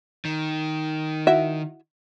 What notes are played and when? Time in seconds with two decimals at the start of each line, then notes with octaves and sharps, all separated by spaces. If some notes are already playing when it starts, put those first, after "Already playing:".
0.25 D#3
1.27 E4 F#4 E5